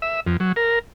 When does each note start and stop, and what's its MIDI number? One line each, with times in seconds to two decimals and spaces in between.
0.02 0.20 76
0.27 0.37 41
0.40 0.52 54
0.56 0.79 70